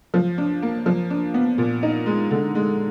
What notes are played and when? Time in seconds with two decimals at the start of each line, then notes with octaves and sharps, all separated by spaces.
0.14 F3
0.38 D4
0.62 A#3
0.86 F3
1.10 D4
1.34 B3
1.58 A#2
1.83 D#4
2.06 G#3
2.31 D3
2.55 G#3